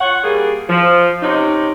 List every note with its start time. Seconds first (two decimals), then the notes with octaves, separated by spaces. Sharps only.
0.01 F4 C#5 F#5
0.23 G3 A#3 G#4
0.69 F3
1.22 C3 C#4 D#4